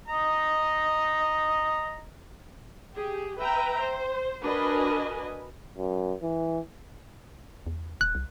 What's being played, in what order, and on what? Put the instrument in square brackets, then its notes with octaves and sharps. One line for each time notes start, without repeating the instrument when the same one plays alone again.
[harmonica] D#5 A#5
[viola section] G4 G#4
B4 E5 G5 A#5
C5
D4 F#4 A#4 B4 D#5 G#5
[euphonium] F#2
E3
[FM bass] E2
[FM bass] D#1 [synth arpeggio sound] F#6
[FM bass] C2